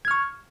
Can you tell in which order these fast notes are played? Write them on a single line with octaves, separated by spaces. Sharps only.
G#6 F6 C#6